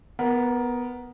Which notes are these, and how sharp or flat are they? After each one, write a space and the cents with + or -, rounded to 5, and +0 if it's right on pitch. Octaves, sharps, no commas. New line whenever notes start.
B3 +0 A#4 +15